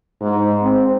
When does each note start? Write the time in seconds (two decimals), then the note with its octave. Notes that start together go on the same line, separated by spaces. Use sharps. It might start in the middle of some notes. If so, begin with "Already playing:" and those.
0.21 G#2
0.63 C4